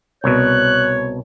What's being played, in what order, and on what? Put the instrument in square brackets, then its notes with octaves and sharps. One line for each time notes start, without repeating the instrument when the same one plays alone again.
[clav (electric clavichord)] C2 B2 [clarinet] C#5 [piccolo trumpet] F#6